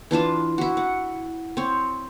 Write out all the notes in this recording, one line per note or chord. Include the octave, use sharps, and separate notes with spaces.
E3 D4 F4 A5
E4 F#4
F#5
C4 C#5